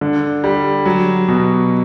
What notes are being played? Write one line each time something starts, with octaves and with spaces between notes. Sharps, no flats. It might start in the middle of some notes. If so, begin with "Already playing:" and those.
D3
G3
F#3
B2